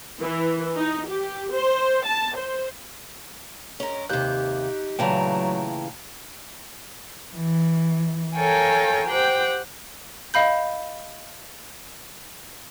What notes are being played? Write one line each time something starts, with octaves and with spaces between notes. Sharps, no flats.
E3
D#4
G4
C5
A5
C5
G#3 C#4 A#4 C#5 A#5
D#2 C3 D#4 G4 F#6 G6
A#2 C#3 E3 F#3 A3 G5 A5 A#5
E3
A4 A#4 C#5 F5 G5 G#5
G4 C5 F#5 G5
D#5 F5 B5 G6